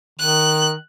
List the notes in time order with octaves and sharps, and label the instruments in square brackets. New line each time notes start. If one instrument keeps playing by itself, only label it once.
[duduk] D#3 [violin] F#6